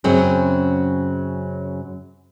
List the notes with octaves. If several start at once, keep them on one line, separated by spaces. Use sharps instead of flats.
F#2 C#3 F#3 C4 G#4